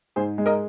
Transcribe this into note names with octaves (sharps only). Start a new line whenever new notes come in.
G#2 G#4 C5
G#3
A#4 D#5